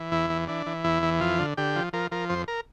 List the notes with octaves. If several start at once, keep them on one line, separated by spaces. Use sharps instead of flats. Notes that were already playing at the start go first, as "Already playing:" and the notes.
Already playing: E3
E2 E4
E3
E3 D4
E3
E2 E4
E3
F2 F4
D3
D3 G4
F3
F3 A#4
F3 A#4
F2 C5
A#4